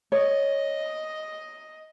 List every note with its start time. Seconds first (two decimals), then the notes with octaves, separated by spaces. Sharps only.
0.12 C#5 D#5